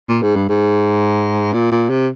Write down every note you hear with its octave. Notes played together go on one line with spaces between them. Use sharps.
A#2
G#2
G2
G#2
A#2
A#2
C3